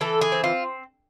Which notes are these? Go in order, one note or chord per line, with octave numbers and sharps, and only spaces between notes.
E3 A4
G#4
C4
F4